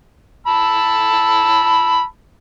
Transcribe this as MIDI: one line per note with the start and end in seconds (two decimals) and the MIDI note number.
0.47 2.03 81
0.47 2.03 83
0.47 2.03 88